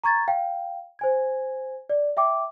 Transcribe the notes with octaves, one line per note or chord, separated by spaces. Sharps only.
A#5 C#6 G#6 A6
F5 G5
C5 G#5 G#6
D5
E5 G5 D6